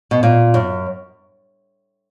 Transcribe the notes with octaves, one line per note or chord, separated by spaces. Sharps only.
B2
A#2
F#2